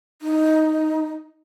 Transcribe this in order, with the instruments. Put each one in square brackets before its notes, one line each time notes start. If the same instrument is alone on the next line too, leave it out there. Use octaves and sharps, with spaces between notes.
[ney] D#4